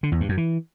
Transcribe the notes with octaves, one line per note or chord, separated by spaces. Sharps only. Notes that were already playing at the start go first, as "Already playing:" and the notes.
D3
E2
G2
F#2
E3